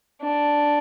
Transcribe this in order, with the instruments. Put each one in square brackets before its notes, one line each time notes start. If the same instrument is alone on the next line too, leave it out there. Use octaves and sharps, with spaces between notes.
[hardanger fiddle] D4